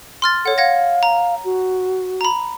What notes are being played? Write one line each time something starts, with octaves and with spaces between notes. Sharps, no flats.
C6 F6 A6
A4 C#5 F#5
F5 F#5 G#6 A#6
A#5
F#4
A#5 B5